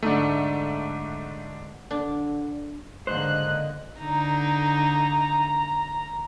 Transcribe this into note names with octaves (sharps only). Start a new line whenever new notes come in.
G#2 D3 A3 D4
D3 D4
C#2 G#2 D3 A#3 C5 D#5 F#6
D3 D#4 A#5